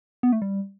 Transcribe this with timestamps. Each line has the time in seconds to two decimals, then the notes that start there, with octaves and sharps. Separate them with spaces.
0.23 B3
0.32 A3
0.42 G3